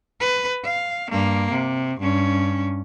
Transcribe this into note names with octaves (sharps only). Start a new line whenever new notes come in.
B4
F5
G2 A#3
C3
G2 C#4